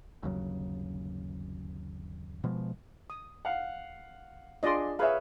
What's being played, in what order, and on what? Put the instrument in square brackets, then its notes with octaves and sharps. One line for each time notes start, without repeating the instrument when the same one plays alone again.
[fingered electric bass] G1 D#2 C#3 F#3
B2 F3 G#3
[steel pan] D#6
[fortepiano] F5 F#5
[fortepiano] D4 G#4 C6 [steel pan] F4 D5 D#5
[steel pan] G#4 F5 [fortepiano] B4 C#5 E5